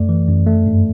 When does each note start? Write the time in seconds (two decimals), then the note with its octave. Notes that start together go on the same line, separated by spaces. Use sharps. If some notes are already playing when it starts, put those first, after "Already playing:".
Already playing: F#2 A3 D5
0.09 E3
0.28 F#2
0.46 A3
0.67 G2